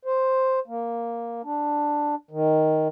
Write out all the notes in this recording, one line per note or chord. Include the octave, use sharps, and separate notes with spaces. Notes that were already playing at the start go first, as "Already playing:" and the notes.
C5
A#3
D4
D#3